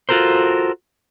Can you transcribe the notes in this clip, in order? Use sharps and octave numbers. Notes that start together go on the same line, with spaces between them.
F4 F#4 A4 A#4 C5